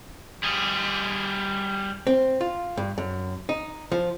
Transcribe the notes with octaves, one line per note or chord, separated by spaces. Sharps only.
G3 G#4
C4
F4
G2
F#2
D#4
F3